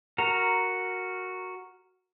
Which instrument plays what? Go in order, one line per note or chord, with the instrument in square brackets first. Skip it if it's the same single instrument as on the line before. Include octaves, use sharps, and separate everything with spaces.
[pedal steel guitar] F#4 A#4 A#5